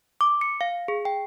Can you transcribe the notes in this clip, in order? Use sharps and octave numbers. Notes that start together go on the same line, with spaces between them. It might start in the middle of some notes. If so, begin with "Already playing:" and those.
D6
C#7
F5
G#4
G5